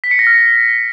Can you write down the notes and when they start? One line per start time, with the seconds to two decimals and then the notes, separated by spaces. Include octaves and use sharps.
0.04 B6
0.11 C#7
0.19 A#6
0.27 F6
0.34 C#7